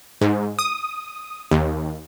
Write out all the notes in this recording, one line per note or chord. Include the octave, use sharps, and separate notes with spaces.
G#2
D#6
D#2